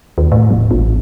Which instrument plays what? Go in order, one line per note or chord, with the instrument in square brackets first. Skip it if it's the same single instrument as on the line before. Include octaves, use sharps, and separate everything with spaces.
[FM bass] D#2
A2
D#1
A1